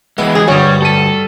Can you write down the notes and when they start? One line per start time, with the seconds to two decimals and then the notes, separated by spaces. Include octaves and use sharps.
0.18 E3 G#3 B3 E4
0.35 G#4
0.48 D2 G2 G3 F#4 C#5
0.82 G3 A4 D#7